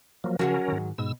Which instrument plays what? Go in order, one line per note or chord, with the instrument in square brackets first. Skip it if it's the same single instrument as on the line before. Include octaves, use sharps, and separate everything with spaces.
[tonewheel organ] F3 F#3 A#3
[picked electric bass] C#3 F3 [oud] F#3 F#4 G#4 [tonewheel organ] C#4 A#4
[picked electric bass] G#2 D#3
[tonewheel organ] G#2 E6 [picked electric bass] B2